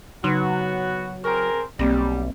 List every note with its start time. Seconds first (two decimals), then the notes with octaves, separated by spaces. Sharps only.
0.24 C#3 F#3 B3 D#4 F#4 C6
1.24 C4 G#4 A#4 C#6
1.79 B1 G3 A#3 C4 A#6